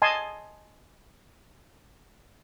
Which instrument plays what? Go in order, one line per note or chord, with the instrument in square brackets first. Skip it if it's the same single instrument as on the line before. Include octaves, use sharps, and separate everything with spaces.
[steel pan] D#5 G#5 A5 C6